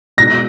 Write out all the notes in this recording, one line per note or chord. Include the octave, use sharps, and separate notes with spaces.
B2 G#3 D#4 F#4 A#6